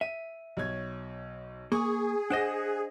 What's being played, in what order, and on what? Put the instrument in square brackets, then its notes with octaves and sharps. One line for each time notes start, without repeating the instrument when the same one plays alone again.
[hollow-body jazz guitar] E5 [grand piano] D#7
[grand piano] B1 C#5 G#6
[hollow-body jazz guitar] A#3 [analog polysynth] G#4 [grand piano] C#6 D#6
[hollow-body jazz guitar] D4 C5 D#5 [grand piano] F#5 A#6